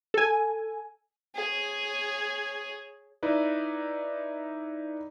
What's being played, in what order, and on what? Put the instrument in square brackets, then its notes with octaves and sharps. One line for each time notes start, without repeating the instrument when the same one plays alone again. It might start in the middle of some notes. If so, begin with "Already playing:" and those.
[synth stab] A4 G#5
[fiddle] G#4 C#5
[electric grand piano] D#4 E4 B4 D5